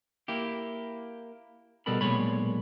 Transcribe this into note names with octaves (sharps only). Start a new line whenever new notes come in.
A#3 E4 G4
B2 G3 B3 A4 A#4 B5
B1 G2 A#2 G#3 C#5 B5